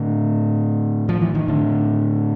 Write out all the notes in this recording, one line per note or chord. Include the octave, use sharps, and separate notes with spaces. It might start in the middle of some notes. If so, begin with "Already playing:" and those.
Already playing: A2 D3
F3
E3
D#3
A2 D3